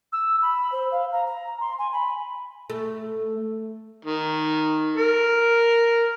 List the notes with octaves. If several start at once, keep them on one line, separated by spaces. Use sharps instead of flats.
E6
B5
C5
F5
A#5
A#5
C6
G#5
B5
A3
D#3
A#4